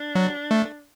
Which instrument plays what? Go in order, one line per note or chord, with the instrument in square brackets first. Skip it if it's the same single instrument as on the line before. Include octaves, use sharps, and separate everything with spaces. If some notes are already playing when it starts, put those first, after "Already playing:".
Already playing: [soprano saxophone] D4
[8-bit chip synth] F#3
A3